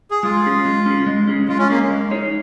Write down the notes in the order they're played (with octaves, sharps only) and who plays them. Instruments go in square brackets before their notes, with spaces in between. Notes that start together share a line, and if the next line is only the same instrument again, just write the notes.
[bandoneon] G#4
[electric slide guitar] G#3 [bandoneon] F4
[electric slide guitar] C#4 G#4
G#3
C#4 G#4
G#3
C#4 G#4
[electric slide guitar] G#3 [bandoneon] F4
[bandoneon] C#4
[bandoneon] A#3 [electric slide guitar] C#4 G#4
[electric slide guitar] G#3
D#4 G#4 C#5